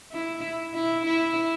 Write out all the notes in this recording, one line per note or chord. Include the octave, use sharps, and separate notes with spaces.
E4
E4
E4